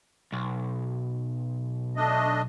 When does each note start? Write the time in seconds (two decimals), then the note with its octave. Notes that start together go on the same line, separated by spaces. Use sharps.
0.32 B1
1.96 A3 D4 D#5